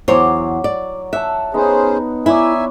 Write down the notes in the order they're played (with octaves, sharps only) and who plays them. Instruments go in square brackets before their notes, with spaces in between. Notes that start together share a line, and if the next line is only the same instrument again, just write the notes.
[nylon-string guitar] E2 C5 C#5 [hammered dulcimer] F#3 D6
[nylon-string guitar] D5
[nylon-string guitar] E5 [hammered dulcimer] F#5 A5
[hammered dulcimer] B3 D#4 [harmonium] C#4 G#4 C5
[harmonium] D#4 E5 G#5 [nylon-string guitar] E4 [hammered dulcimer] B4 C#5 D5